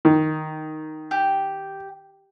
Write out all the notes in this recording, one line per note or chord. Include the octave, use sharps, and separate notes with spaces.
D#3
G4